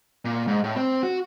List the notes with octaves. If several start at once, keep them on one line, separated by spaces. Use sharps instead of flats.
A#2
G#2
A2
C4
F#4